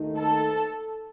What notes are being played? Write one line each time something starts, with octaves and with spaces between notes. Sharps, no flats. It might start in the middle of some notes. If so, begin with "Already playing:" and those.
Already playing: D#2 D#3 A3 D#4
A4